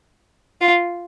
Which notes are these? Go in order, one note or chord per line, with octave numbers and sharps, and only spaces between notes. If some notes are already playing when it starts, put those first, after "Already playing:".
F4